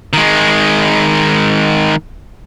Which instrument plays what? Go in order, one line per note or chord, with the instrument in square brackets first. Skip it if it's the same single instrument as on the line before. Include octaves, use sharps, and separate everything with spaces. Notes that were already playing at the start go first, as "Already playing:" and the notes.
[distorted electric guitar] D#3 G#3